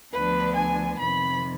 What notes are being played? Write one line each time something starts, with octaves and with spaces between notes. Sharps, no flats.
D2 D3 F3 B3 D4 B4
G#5
F2 C3 D#3 B5